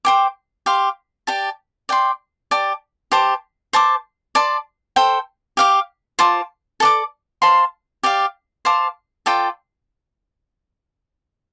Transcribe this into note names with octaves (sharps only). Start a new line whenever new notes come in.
C5 G5 D6
G4 F5 C6
G4 D5 A5
D5 G5 C6
G4 D5 A5 D6
G4 C5 A5 D6
C5 A5 D6
D5 A5 C6
A4 C5 G5
G4 F5 D6
F4 C5 A5 D6
A4 D5 A5 D6
C5 F5 A5 C6
G4 D5 F5
C5 F5 A5 D6
F4 A4 D5 G5